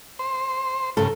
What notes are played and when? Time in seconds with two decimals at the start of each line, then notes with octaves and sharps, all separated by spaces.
0.19 C5
0.97 G2 C#3 A4 A#4